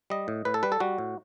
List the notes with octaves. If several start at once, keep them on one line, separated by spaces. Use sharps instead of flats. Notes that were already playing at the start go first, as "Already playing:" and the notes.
G3 D#5
A2
A2 B4
A4
G3 B4
A4
G3 F#4
A2